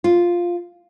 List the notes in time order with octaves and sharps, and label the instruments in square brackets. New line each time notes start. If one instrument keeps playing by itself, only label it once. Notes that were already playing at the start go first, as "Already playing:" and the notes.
[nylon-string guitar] F4